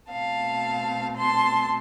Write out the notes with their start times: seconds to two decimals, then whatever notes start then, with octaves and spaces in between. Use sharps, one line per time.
0.12 B2 A3 C4 F5 A5
1.17 A5 C6